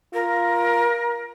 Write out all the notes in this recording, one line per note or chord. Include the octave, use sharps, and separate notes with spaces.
F4 A#4